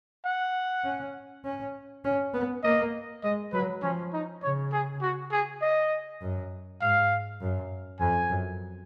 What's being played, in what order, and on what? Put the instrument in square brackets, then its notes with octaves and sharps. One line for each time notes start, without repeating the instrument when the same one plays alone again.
[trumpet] F#5
[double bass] C#4
C#4
C#4
B3
[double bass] A#3 [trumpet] D#5
[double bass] G#3 [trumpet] D#5
[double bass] F#3 [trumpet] B4
[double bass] F3 [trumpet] C#4
[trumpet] D#4
[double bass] C#3 [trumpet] C#5
[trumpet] G#4
F#4
G#4
D#5
[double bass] F#2
[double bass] G#2 [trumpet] F5
[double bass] F#2
[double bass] F2 [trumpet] G#5
[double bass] F#2